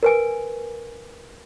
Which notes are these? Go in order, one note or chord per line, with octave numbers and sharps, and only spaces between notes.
A#4 B4 G#5